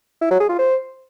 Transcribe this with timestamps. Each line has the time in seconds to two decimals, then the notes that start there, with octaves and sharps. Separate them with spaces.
0.22 E4
0.31 F#3
0.40 G#4
0.49 F4
0.59 C5